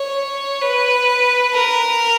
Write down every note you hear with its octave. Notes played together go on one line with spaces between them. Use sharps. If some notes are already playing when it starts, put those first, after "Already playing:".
Already playing: C#5
B4
A#4